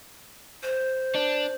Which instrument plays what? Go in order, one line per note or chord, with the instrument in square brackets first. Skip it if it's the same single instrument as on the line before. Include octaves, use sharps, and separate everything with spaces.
[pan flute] C5
[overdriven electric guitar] D4